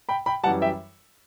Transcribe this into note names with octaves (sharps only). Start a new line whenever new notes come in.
G5 B5
G5 B5
F#2 E3 G3 F#5 A5
E5 G5